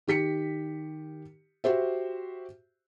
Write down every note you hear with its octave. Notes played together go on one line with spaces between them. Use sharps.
D#3 G4 B6 C#7
F#4 G4 C5 E5